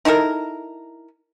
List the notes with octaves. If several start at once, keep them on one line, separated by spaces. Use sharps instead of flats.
D#4 E4 A4 A#4